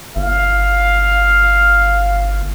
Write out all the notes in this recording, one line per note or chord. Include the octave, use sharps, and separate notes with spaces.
G1 F5